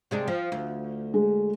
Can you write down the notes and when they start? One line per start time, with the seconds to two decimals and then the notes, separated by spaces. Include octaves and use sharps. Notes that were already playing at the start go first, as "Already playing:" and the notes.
0.11 C3 G#3 D4
0.27 F3
0.52 D2
1.14 G#3